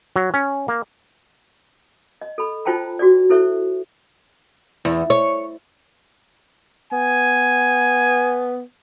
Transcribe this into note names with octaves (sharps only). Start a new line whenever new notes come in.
F#3
C#4
A#3
D#5
A4 B5
D#4 F4 C5 G5 A5 A#5
F#4 G#4 D5
E4 A4 C5 E5 C#6
E2
C#5
B3 G#5